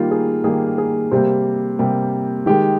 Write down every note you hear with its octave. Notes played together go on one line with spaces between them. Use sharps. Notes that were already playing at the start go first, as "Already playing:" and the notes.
Already playing: D#3 G3 A#3 F4
G#4
D#3 G3 A#3 G#4
G#4
C3 G3 A#3 C5
C3 G3 A#3
D#3 G#3 G4